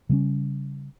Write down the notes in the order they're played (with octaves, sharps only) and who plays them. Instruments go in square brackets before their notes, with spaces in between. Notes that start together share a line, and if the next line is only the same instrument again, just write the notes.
[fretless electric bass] C#3 G3 A#3 C#4